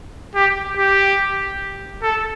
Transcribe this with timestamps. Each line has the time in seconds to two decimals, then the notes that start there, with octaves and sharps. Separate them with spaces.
0.35 G4
0.77 G4
2.02 A4